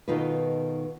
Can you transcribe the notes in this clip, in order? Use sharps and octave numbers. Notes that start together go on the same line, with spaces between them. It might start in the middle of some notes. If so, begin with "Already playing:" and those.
B2 D#3 D#4 F4 A4 B4